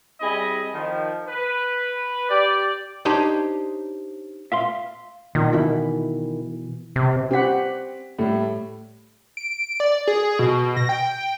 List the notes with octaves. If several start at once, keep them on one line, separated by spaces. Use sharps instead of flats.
G3 C4 E4 G#4 D#5 B5
D#3 F3
B4
G4 D5
D4 D#4 G4 C5 C#5 D#5
E5 F5 C6
A#2 D#3
B2 E3 E4
C3
C4 G4 F#5 B6
A2 G3 A3
D7
D5
G#4
B2
A#6
G5